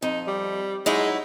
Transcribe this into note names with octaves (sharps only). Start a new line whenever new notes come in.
F2 D#4
G3
F#3 G#3 D#4 E4